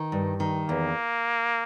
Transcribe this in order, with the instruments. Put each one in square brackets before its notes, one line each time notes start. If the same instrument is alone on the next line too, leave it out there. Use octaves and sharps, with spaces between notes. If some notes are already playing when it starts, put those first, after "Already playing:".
Already playing: [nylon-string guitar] D#3
G2
D#3
[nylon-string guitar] E2 [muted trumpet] A#3